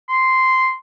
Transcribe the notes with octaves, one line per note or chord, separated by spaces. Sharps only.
C6